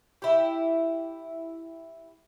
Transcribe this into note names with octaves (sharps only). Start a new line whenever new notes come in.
E4 G4